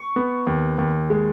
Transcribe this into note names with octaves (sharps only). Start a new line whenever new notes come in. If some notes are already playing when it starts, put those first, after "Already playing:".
Already playing: C#6
B3
D#2
D#2
G#3